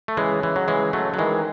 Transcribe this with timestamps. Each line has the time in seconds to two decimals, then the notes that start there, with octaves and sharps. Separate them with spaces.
0.08 A3
0.17 C#3 E3 G#3
0.43 E3
0.56 F#3
0.68 E3 G#3
0.93 F#3 A3
1.14 F#3
1.19 D#3 E3 G#3